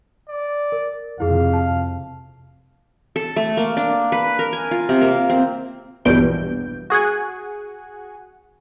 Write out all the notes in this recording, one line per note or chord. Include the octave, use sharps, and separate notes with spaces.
D5
A#4
F2 C3 E4 G#4 F5
A5
A4
A3
A#3
D4
B4
A#4
G#5
F4
C3
A#3
C4
A#1 E2 G2 B2 G6 D7
F#4 G#4 F#5 G#5